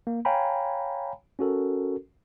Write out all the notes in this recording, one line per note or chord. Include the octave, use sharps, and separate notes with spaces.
A#3
C#5 F5 G5 G#5 A#5 B5
C#4 F#4 A4 A#4